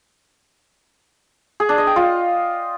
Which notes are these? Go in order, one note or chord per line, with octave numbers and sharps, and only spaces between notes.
G#4
D4
D#5
G5
F4